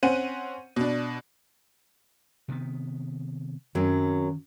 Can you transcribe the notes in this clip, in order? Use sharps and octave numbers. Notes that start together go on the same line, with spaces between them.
C4 C#4 C5 F#5 D#7
B2 D4
C3 D#3 B3
F#2 D#3 F#3 C4